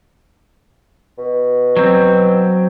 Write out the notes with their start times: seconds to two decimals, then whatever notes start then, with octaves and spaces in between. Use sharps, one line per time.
1.18 B2
1.77 F#3 C4